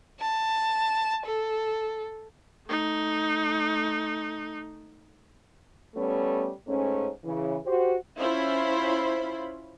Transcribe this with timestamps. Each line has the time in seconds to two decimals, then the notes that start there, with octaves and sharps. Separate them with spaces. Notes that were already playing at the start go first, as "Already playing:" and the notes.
0.20 A5
1.25 A4
2.67 A3 D#4
5.95 G3 A3 B3 C#4
6.66 G#2 A3 C#4
7.24 C#3 E3
7.65 F#4 G4 C5
8.19 C#4 E4 F4 C5 B5